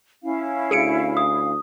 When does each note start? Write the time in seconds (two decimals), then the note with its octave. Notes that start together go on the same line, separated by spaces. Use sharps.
0.23 C#4 E4 F5
0.71 D2 G#4 C#7 D7
1.17 D#6